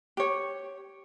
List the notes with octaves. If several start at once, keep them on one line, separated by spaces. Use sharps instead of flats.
G4 C#5